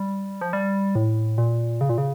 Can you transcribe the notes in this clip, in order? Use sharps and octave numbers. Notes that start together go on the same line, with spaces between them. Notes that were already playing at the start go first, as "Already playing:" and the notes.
Already playing: G3
F3
G3
A2
A#2
C#3
A#2
C#3